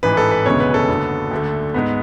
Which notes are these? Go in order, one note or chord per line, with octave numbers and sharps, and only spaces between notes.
A1 G#2 E3 B4
A4
B4
E1 D2 C#3 G#3 B3 C#5
B4
A4
F#1 E2 D3 F#3 B3
D2 D3 A3
G#2 G#3 B3